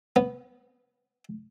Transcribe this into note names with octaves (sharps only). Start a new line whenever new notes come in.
B3